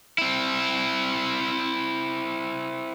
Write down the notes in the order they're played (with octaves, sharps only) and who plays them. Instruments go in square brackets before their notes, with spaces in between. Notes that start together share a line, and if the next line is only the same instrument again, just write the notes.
[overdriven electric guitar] C4 E4